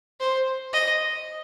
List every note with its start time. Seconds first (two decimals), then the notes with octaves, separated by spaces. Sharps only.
0.20 C5
0.73 D#5